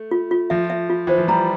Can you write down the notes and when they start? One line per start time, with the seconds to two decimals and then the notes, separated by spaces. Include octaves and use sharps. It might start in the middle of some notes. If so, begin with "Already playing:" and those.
Already playing: A3
0.11 F4
0.31 F4
0.50 F3 E5
0.70 E5
0.90 F4
1.07 E3 C5
1.18 F3
1.28 G3 A#5